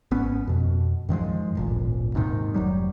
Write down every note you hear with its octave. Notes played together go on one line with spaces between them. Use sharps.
G#1 B3 C#4
F2 B2
F#2 D#3 F3 G#3
D1 G#1 A#2
D#2 G#2 C3 D#3
F1 F#3 G3